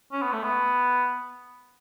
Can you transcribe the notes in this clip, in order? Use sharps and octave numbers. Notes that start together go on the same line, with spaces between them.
C#4
B3
A3
B3